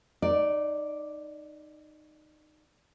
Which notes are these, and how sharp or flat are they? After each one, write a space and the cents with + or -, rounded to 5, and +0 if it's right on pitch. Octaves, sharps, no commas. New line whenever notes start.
D#4 -15 D5 +0